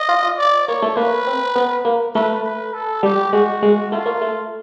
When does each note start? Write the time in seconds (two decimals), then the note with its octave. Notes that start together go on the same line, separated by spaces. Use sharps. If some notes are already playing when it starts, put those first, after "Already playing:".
Already playing: D#5
0.09 F4
0.23 F4
0.38 D5
0.68 A#3 C#5
0.82 A3
0.97 A#3 B4
1.27 C4
1.56 B3
1.85 A#3
2.15 A3 B4
2.44 B4
2.74 A4
3.03 G3 G4
3.33 G#3 F#4
3.63 G#3
3.91 A3 F4
4.06 A#3
4.22 A3